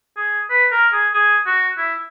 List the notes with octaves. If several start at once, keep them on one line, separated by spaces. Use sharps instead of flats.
G#4
B4
A#4
G#4
G#4
F#4
E4